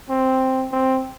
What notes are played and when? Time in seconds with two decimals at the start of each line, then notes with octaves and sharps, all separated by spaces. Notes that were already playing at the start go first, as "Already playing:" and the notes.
0.10 C4
0.72 C4